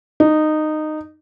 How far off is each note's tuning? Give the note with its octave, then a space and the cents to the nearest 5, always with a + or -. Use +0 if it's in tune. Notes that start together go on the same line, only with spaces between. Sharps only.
D#4 -15